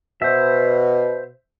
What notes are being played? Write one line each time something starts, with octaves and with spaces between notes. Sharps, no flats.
B2 C5 E5